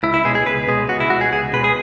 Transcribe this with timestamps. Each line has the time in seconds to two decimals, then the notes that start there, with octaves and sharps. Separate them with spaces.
0.03 C#2 E4
0.14 E4
0.25 B2 G#3 G#4
0.35 G#4
0.46 C#2 B4
0.68 B2 G#3 G#4
0.89 C#2 F#4
1.00 E4
1.10 B2 G#3 F#4
1.21 G#4
1.32 C#2 G#4
1.53 B2 G#3 B4
1.64 G#4